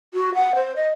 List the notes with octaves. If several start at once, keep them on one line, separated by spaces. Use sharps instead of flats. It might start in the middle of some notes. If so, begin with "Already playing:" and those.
F#4
F#5
C5
D#5